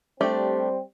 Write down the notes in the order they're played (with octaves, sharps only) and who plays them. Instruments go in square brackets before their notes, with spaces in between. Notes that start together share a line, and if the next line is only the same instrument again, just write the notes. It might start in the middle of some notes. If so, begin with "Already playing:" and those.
[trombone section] G3 C4 [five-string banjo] A3 D4 G4